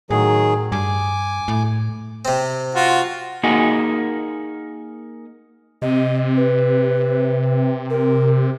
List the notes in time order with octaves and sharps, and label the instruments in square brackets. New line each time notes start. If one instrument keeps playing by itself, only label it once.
[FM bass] A2 [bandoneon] D#3 F#3 G#4
[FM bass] G2 [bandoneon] G#5 D6
[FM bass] A2
[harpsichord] C3 C4
[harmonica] F4 F#4
[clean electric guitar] A#3 D#4 F#4 G#4
[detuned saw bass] C3 [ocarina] D#5
[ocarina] B4
A#4